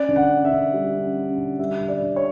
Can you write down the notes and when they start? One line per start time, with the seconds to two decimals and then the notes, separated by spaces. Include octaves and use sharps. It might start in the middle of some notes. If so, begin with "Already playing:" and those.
Already playing: C#4 D5
0.09 D3
0.16 F#5
0.30 C#4
0.45 E5
0.51 D3
0.73 G3
0.95 C#4
1.17 C#4
1.38 D3
1.59 G3 E5
1.81 D3
1.88 D5
2.02 D3
2.16 C#5